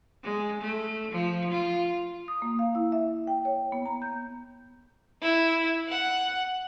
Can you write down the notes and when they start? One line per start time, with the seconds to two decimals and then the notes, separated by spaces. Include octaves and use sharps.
0.23 G#3
0.61 A3
1.11 F3
1.51 F4
2.28 D#6
2.42 A#3
2.59 F5
2.75 E4
2.92 E5
3.27 G5
3.45 C#5
3.72 B3
3.85 A#5
4.02 G6
5.22 E4
5.89 F#5